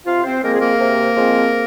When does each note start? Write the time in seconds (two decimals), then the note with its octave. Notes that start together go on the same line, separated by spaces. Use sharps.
0.06 C3 F4 F5
0.24 C4 C5
0.42 F3 G#3 A#3 C4 A#4
0.52 G#4
0.61 A#3 A#4
0.79 C3
1.17 F3 G#3 C4